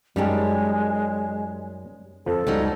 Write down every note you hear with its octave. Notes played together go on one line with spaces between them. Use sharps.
F#2 G3 G#3 C#4 D#4 G4 A5
F2 F3 A4
C#2 F#3 G3 D#4